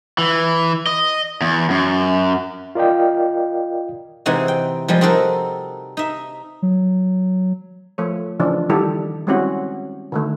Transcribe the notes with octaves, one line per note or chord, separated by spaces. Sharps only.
E3
D#5
E2
F#2
F4 A#4 D5 D#5 F5 G5
C3 E3 G#3 C4 D#4 F#4
G5
F3 G3 G#3
C4 D#4 F#4 A4 A#4
D#4 E5
F#3
F3 A3 C#5
C#3 E3 F3 D4
D#3 G3 E4 G4 A4
G3 G#3 C4 C#4 E4 F#4
D3 D#3 A3